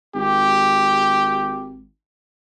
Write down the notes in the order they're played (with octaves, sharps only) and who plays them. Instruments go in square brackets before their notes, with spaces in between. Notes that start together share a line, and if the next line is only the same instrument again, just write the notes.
[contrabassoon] G#1 [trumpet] G4